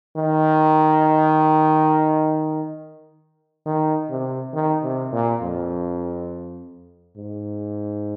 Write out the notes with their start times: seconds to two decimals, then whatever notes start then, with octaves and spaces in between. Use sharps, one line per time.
0.16 D#3
3.66 D#3
4.10 C3
4.54 D#3
4.83 C3
5.12 A#2
5.42 F2
7.17 G#2